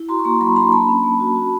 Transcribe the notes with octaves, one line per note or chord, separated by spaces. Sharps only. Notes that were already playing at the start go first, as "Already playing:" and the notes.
Already playing: E4
F#4 A#5 C6
C#6
A#3 A#5 C6
F#3 B5 C#6
D4 A#5 C6
A#3 A5 B5
C#4
A#3
F#4
F#4